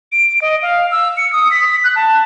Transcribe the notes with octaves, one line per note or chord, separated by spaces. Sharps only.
D7
D#5
F5
E6
C#7
D#6
B6
F#6
A5